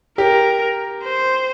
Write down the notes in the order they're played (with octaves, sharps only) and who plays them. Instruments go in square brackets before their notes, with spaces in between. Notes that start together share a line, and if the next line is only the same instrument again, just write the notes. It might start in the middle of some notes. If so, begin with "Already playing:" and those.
[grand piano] G4 [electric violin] A#4
[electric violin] C5